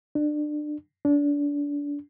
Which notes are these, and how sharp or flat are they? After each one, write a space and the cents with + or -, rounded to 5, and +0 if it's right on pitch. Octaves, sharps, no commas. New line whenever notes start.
D4 +25
D4 -30